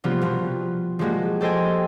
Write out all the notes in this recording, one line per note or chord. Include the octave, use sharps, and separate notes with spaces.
C3 F3 G3 A#3 B3 F4
B2 F3 A#3 B3
F3 G3 G#3 A#3 F#4
G4 A4 C5 D#5 G5 G#5